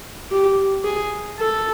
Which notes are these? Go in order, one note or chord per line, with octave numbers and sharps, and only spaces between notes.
G4
G#4
A4